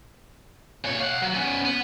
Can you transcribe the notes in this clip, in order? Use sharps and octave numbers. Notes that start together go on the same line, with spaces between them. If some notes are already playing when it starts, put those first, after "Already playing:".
A#2 C#5
F5 F#5
F#3
B3 C#4
B3